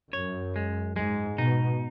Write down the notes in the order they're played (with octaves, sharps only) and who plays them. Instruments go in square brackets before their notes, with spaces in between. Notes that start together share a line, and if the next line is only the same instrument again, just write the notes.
[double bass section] F#2 [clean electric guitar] C#5
[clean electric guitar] G#3
[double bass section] G#2 [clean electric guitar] G#3
[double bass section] B2 [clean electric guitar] D#4